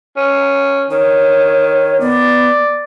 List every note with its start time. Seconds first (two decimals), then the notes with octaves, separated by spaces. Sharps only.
0.16 C#4
0.90 D#3 C#5
2.01 B3 D5